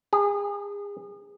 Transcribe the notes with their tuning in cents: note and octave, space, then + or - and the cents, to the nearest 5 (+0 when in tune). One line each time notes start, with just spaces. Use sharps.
G#4 -35